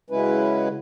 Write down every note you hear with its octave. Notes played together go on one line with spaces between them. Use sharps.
C#3 F#3 G#3 C#4 E4 B4